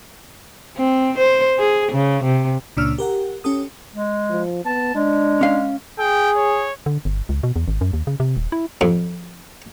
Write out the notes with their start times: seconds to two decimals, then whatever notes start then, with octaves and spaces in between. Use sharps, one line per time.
0.77 C4
1.18 C5
1.58 G#4
1.92 C#3
2.23 C3
2.77 C#2 A#2 C#3 D4 E6 F6
2.98 G4 A#4 F#5
3.44 C#4 G4 A4 D#6
3.95 G#3
4.30 F3
4.65 B3 A5
4.95 G#3 D4
5.41 C#4 F5
5.99 G#4 G5
6.36 C#5
6.86 D3
7.05 G1
7.29 C#2
7.43 B2
7.56 E2
7.68 G#1
7.81 F#2
7.93 D#2
8.07 C#3
8.20 C3
8.37 D#1
8.52 E4
8.81 F2